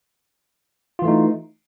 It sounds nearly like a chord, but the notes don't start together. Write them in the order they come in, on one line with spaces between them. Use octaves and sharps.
F4 E3 A3 D#4